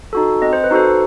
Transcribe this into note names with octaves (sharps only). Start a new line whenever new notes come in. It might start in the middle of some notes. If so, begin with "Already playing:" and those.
D#4 F#4 A4
C4 D#5
C5
B4
D#4 F#4 A4 C5